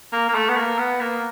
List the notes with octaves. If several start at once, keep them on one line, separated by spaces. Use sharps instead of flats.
A#3
A#3
A3
B3
A#3
B3
A#3